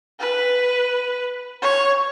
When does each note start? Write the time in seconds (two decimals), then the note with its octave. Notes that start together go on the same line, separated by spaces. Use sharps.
0.20 B4
1.62 C#5